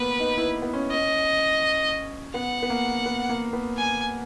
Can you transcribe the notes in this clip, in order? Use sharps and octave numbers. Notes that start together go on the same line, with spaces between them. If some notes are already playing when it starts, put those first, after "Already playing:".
Already playing: A#3 B3 B4
D#4
E4
B3
C#4
D#5
B3 F#5
B3
A#3
B3
A#3
B3
G#5